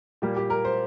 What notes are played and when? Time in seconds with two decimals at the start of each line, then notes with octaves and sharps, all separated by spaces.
0.22 A#2 G3 A#3 G4
0.36 G4
0.50 A#4
0.65 C5